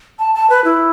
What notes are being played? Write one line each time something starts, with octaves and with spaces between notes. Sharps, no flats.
A5
A5
B4
E4